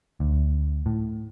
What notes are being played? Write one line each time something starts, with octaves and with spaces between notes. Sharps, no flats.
D2
A2